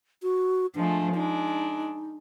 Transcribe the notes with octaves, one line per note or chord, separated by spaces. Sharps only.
F#4
F3 G#3 A3 D4
G#3 D4 D#4